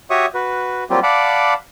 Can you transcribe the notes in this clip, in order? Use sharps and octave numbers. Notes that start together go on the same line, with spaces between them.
F#4 G4 C#5 E5 C#6 D#6
F#4 B4
F#3 G3 A#3 C4 F4 G4
D5 F5 F#5 A5 B5 D6